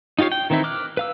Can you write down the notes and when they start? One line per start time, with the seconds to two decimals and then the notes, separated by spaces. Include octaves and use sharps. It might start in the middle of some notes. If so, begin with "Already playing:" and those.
0.19 D#4 F4 G4 C#5 F5
0.32 G5
0.50 D#3 E3 C4 D#4 E4
0.64 D6 F6 F#6
0.97 B4 F5 E6